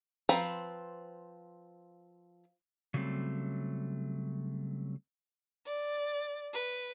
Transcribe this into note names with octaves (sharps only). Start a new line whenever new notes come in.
F3 C4 B4 A#5
C#3 F#3 G3 A3 C4
D5
B4